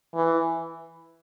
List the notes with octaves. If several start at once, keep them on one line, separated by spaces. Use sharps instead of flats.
E3